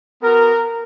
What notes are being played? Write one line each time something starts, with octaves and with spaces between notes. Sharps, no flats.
B3 F#4 A#4